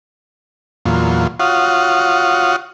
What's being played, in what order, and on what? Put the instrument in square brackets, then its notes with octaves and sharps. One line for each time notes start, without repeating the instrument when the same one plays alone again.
[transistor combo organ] E2 A#2 F#3 F4
F4 F#4 C#5 F5 F#5 D#6